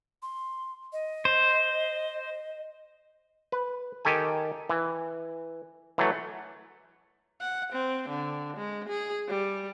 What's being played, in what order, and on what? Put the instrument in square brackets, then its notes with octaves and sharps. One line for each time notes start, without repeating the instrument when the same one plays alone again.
[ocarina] C6
D#5
[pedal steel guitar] C5
[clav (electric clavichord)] B4
D#3 G4 A4 G#5
E3
E3 F#3 A3
[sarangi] F#5
C4
D3
G#3
G#4
G3